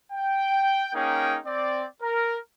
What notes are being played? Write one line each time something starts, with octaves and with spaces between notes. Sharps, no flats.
G5
A#3 C#4 D#4 G#4 A#4 G5
C4 D5
A#4